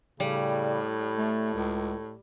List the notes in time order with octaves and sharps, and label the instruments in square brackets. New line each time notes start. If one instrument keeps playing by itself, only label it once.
[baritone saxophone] A2 [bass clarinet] C#3 [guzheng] G3
[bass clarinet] A3
C#2